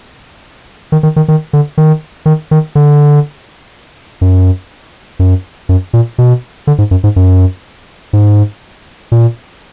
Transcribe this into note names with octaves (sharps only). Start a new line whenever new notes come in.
D#3
D#3
D#3
D#3
D3
D#3
D#3
D#3
D3
F#2
F#2
F#2
A#2
B2
D3
G#2
F#2
G#2
F#2
G#2
A#2